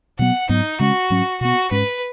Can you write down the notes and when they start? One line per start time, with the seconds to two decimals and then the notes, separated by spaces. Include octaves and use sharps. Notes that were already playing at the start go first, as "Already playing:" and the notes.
0.19 B2 F#3 B3 F#5
0.49 G#2 F#3 B3 D#4
0.79 C#3 G#3 C#4 F#4
1.10 G#2 F#3 C#4
1.41 B2 B3 F#4
1.71 G#2 G#3 C#4 B4